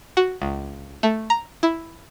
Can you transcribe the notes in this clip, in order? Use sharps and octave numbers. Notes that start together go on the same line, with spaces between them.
F#4
C#2
A3
A#5
E4